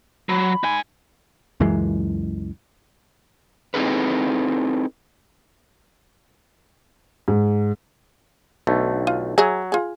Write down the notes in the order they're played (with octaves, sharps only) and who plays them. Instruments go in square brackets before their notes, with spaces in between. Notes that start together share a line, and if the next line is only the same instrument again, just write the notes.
[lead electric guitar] F#3 [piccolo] B5
[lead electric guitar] D#4 G#5
[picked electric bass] C#2 F#2 E3 G#3
[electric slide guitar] C4 D#4 E4 G#4 A4 B4
[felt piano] G#2
[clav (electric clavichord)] B1 D3 A3
[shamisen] F4
[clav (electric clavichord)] F#3 [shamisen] G#4 E5
[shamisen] F4 G#4